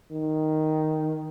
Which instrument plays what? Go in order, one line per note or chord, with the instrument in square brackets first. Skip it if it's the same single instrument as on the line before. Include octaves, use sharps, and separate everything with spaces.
[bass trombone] D#3